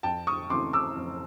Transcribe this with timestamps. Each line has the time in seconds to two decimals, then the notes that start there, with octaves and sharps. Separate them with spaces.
0.03 F2 G5 A5
0.27 C#6 D#6
0.50 C#3 E3 A3 C4 C6 D6
0.73 D6 E6
0.96 F2